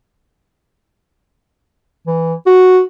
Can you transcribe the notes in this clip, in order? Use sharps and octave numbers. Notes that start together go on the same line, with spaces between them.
E3
F#4